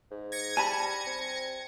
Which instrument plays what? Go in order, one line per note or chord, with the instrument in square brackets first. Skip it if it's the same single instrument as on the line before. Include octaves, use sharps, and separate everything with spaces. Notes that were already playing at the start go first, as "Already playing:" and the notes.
[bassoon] G#2
[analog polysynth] G#6 A#6 C#7
[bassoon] G3 [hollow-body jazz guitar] G#5 A5 B5
[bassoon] C4